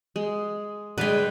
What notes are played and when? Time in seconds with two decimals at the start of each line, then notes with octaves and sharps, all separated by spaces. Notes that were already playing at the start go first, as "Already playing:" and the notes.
0.16 G#3
0.98 D3 G#3 B4 F5 G5